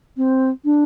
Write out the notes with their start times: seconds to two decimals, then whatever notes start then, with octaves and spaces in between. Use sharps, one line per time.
0.17 C4
0.65 D4